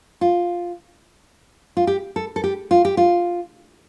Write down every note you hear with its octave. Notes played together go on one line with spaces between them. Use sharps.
F4
F4
G4
A4
A4
G4
F4
G4
F4